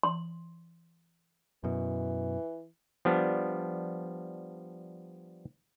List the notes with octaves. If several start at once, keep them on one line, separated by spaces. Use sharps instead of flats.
C6
F#2 B2 E3
F3 G3 B3 D4